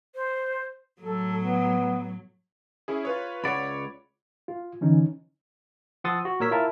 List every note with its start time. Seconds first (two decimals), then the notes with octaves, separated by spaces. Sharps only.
0.15 C5
1.01 A2 F#3 A4
1.38 B3
2.88 C#4 E4 G#4
3.05 F4 B4 C#5
3.44 C#2 C#5 D5 F#5 B5
4.48 F4
4.81 D3 E3 C#4 D#4
6.04 F3 F#5 C6 D#6 E6 A6
6.25 F#4
6.40 A#2 A#4 C#5 E6 B6
6.51 E4 F4 A#4 E5 A5